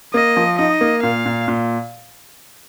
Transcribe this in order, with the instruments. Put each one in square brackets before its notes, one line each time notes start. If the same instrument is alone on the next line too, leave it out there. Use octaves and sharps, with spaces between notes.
[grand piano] A#3 [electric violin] D#5
[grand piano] F3
[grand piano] D#4 [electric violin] D#5
[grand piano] A#3
[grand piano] A#2 [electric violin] F5
[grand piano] A#2
A#2